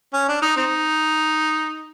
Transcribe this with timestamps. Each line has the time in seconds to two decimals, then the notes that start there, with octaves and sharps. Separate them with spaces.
0.13 C#4
0.28 D4
0.42 D#4
0.56 C4 D#4